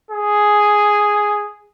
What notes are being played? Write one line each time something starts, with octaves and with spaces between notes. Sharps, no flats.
G#4